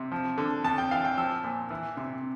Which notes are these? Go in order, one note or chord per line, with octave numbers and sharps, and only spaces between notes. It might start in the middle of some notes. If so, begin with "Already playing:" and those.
Already playing: C3
F3
D3
F2 A5
G5
E3 F5
G5
F3 E6
A#2
E3
C3